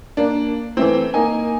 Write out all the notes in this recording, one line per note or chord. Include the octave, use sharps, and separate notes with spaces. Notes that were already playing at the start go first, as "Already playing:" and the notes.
A#3 D4
E3 A3 C4
A#3 D#4 G#5